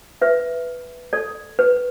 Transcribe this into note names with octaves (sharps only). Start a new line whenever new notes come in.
B4 E5
A4 D5
B4